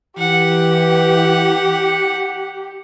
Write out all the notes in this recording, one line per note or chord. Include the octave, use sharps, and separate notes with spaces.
E3 G4 F#5